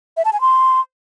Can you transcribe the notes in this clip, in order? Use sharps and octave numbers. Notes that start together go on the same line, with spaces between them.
E5
A5
G#5
C6